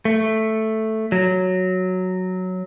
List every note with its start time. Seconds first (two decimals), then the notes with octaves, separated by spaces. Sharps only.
0.05 A3
1.12 F#3